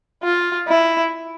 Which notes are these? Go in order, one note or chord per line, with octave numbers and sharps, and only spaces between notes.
F4
E4